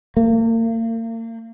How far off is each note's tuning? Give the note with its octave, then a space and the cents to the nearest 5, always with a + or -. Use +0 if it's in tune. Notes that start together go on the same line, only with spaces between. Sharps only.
A#3 -40